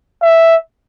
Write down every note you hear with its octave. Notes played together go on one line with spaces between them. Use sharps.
E5